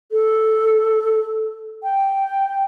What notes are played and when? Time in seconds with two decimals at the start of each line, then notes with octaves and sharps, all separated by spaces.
0.12 A4
1.83 G5